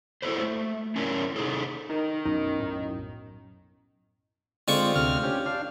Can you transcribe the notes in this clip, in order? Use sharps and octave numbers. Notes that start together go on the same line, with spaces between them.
E4 F#4 G4 A4 B4 C5
A3
C#4 D4 E4 A#4 C#5
C3 D#4 G#4 A4
D#3 D#4
B1 F#2 D#4
A2
D3 G#3 C4 F4 C#6
D2 C3 F6
C#4 G4
D4 F5